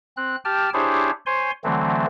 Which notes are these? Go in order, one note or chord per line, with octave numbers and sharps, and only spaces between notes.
C4 F#6
G4 G5 A5 F6
D4 E4 G4 G#4 C5 C#5
C5 C#5 G#5 C6
D3 E3 F#3 A3 C4